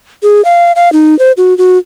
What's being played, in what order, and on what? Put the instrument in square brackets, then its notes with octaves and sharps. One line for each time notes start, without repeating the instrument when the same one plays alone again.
[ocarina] G#4
F5
F5
D#4
C5
F#4
F#4